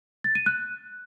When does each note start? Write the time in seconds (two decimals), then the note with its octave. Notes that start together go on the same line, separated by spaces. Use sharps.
0.24 A6
0.35 D#7
0.46 F#6